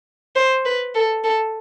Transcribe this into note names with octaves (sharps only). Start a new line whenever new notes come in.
C5
B4
A4
A4